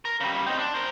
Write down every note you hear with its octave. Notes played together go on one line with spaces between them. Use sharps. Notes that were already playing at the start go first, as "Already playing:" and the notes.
A#4
C#3 G3
C4 D#4
D4
A#4 C5